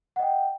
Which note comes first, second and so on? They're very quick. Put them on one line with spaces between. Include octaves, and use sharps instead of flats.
F#5 D#5 G5